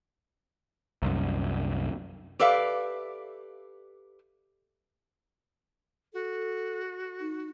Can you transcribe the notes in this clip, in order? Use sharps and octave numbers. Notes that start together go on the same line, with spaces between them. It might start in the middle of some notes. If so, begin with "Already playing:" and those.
C2 F#2
G4 A4 B4 D5 E5 F5
F#4 A4
D#4